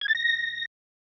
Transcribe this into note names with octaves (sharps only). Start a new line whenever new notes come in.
G#6
A6
A#6